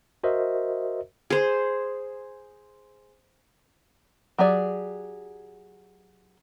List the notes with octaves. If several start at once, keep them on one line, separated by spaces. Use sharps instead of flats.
F#4 A#4 C5 D#5 E5
G#4 C5
F#3 G4 G#4 D5